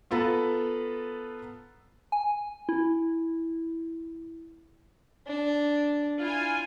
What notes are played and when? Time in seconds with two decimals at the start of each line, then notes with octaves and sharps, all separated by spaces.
0.11 B3 F4 A4 B4 A#5
2.12 G#5
2.69 E4
5.27 D4
6.21 E4 F4 G#5